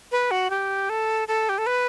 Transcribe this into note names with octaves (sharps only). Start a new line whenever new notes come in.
B4
F#4
G4
A4
A4
G4
A4
B4